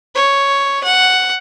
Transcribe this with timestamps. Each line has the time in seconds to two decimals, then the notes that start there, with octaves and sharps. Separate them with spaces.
0.15 C#5
0.83 F#5